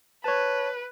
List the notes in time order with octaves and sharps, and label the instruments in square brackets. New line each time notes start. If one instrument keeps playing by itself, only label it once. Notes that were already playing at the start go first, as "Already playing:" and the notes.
[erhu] B4 [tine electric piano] C#5 A5